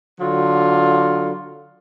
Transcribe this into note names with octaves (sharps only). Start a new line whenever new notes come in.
D3 F#3 F4